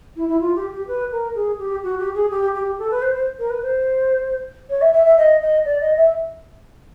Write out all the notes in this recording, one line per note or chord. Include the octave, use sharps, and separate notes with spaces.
E4
E4
F4
G4
G4
B4
A#4
G#4
G4
F#4
G4
G#4
G4
G4
A4
B4
C5
C5
A#4
B4
C5
C#5
E5
E5
E5
D#5
D#5
D5
D#5
E5